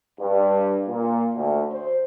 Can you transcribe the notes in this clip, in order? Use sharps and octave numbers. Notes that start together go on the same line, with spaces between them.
G2
A#2
D2
C5